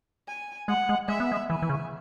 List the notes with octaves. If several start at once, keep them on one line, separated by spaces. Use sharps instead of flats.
G#5
G#3 F#5
G#3
G#3 E5
B3
G#3
E3 G#5
E3
C#3